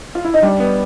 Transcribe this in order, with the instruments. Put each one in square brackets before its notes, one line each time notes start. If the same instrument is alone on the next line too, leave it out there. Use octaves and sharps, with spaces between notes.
[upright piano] F4
E4
D#4
[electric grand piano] G3 [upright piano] D4
[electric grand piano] B3